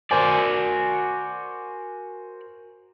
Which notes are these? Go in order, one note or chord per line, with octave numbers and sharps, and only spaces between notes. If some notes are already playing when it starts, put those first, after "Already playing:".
F#4 A#4 C5 D5 G#5